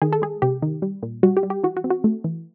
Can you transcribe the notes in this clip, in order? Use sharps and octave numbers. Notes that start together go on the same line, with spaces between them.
D#3 G#4
A4
G#3 G#4
C3 G4
D#3
G3
A#2
G3 F#4
G4
G3
G4
E3 F#4
F#4
C4
F#4
A3
E3